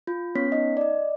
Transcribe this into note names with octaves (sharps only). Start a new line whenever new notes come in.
F4
B3 C#4 C#5 B6
D#4 D#5
D5 D#5